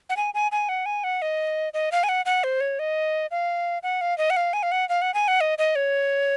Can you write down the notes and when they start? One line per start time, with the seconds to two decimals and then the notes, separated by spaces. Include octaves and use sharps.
0.10 F#5
0.17 G#5
0.34 G#5
0.52 G#5
0.69 F#5
0.86 G#5
1.04 F#5
1.22 D#5
1.74 D#5
1.92 F5
2.03 G#5
2.09 F#5
2.26 F#5
2.44 C5
2.61 C#5
2.79 D#5
3.31 F5
3.83 F#5
4.01 F5
4.18 D#5
4.30 F#5
4.37 F5
4.53 G#5
4.63 F5
4.72 F#5
4.89 F5
5.02 F#5
5.14 G#5
5.28 F#5
5.41 D#5
5.58 D#5
5.76 C#5